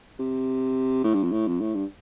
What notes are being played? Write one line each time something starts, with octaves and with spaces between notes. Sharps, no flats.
C3
A2
G2
F2
A2
F2
A2
G2